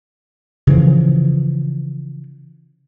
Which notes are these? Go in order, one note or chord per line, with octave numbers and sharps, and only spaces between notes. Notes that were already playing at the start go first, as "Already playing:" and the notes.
C#3 E3 F3